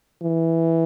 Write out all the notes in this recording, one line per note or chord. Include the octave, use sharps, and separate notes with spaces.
E3